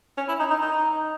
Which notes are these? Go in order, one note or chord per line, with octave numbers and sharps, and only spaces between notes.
C#4
E4
D#4
D#4
D#4